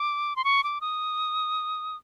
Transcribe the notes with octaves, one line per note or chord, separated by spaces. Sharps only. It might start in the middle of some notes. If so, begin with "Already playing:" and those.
Already playing: D6
C6
C#6
D6
D#6